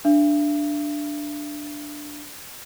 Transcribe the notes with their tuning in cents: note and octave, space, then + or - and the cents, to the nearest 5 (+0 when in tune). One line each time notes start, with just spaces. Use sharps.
D4 +0 E5 +45